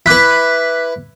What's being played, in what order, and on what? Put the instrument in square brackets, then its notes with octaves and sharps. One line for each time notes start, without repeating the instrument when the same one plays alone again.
[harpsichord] E4 B4 [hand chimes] D6 F#6 B6